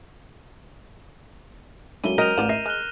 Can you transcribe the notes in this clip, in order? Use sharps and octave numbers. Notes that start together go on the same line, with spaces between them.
D3 F#3 G#3 A#3 C#4 E4 D#7 G7
F#4 G4 A#4 D#5 G6 D#7 F7
A1 F4 D5 F#5 E7
D#5 E5 A#6 C7 D#7
G#3 F6 F#6 G7